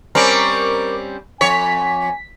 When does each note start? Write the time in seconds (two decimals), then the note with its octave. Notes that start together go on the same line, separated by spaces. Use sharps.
0.15 G3 C4 C#4 A#4 D6
1.41 F2 C#5 G#5 B6